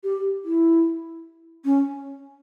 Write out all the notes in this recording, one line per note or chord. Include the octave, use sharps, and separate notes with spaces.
G4
E4
C#4